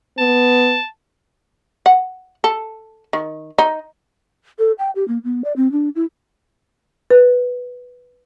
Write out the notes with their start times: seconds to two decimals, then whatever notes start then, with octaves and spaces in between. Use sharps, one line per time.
0.18 B3 A5
1.86 F#5
2.44 A4
3.13 D#3
3.58 D#4
4.59 A4
4.79 G5
4.95 G4
5.08 A#3
5.24 B3
5.44 D5
5.56 C4
5.72 D4
5.95 E4
7.11 B4